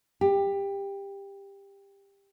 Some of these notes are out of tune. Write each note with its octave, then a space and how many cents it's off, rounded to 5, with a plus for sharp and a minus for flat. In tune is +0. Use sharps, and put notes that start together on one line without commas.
G4 +15